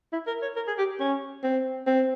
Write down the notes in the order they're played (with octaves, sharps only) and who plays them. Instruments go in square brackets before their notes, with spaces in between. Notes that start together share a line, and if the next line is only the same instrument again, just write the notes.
[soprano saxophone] E4
A#4
C#5
A#4
G#4
G4
C#4
C4
C4